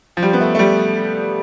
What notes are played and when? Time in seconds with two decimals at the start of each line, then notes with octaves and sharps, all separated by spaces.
0.17 F3
0.22 G3
0.33 B3
0.41 A3
0.55 A3
0.59 G3